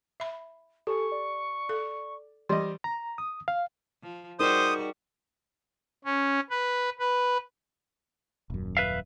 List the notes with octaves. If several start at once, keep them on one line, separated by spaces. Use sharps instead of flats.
E5 B5
G4 A4 G#5 C#6
D5
A4
E3 G3 D#5
A#5
D#6
F5
F3
G3 D#4 F#4 G#4 A#4 C5 D#6
C#4
B4
B4
D#1 F#2
B4 E5 F5